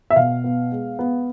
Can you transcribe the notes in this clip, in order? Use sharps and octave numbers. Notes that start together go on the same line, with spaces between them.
E5
B2 F5
B3
G#3
B3